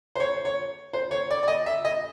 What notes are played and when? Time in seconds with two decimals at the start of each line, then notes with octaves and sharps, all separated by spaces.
0.15 C5
0.20 C#5
0.45 C#5
0.93 C5
1.11 C#5
1.31 D5
1.43 D5
1.48 D#5
1.66 E5
1.85 D#5